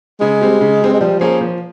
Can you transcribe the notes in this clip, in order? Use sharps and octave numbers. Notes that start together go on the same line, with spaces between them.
C#3 G#3
G3 C4
C#3
G3 C4
G#3
F3 G3
F3 A#3 C#4 G#4
F3